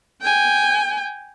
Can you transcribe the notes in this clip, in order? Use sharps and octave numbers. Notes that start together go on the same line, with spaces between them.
G5 G#5